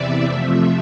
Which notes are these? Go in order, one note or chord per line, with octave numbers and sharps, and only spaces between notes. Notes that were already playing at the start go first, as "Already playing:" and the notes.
Already playing: E2 C3 E3 D5 E5
F2 C3 F3 A3 E5